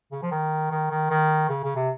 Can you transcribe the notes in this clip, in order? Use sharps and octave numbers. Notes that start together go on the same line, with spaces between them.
C#3
F3
D#3
D#3
D#3
D#3
C#3
C#3
C3